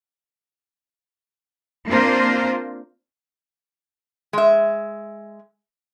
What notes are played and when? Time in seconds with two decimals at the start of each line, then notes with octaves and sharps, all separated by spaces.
1.88 A#3 C4 D4 F4 A#4 C5
4.33 G#3 E5